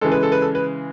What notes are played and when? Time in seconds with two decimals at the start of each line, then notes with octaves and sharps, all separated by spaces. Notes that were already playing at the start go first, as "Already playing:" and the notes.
0.01 C#3 E3 G#3 A4
0.12 B4
0.23 A4
0.32 B4
0.42 A4
0.55 B4